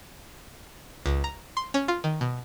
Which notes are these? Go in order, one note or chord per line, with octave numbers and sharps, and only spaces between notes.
C#2
A#5
C6
C#4
F4
D#3
B2